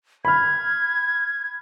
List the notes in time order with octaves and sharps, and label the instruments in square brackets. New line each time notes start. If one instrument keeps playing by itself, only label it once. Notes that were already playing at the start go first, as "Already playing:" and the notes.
[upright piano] B5 F6 [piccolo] G#6